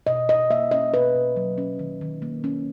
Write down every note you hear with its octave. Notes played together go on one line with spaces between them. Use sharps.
B2 D#5
B2 D#5
A#3 E5
C#4 D#5
B2 B4
B2
F#3
C#4
D#3
D#3
A#3
C#4